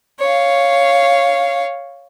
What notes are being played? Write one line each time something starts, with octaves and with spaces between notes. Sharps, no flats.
C#5 F5